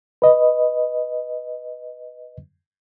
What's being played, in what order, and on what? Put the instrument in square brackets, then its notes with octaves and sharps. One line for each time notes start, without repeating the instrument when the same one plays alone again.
[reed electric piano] B4 D#5